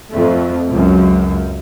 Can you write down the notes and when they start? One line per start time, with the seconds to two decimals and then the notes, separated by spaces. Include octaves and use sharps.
0.10 F2 A3
0.70 C#2 F#2